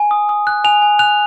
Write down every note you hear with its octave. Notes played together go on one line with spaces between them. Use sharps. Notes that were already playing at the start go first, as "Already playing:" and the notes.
Already playing: G#5
D#6
D#6
F#6
G#5 F7
G#5
F#6 F7